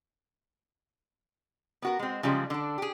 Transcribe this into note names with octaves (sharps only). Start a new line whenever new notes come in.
B3 F#4 A#4
G#3 C4
C#3 F3 G3 G#3
D3 D4
G4 G#4